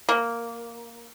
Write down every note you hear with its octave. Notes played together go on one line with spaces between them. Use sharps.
A#3